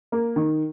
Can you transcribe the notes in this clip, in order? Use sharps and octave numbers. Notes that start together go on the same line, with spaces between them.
A#3
D#3